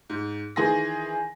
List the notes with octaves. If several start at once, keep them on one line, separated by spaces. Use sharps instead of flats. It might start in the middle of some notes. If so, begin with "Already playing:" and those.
G#2
D#3 E3 G#4 C6 A#6